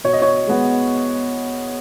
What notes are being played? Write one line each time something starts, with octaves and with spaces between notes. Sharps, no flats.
B2 C#5
D#5
C#5
G#3 B3